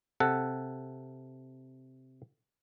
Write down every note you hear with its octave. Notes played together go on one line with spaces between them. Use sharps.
C3 A4 F#5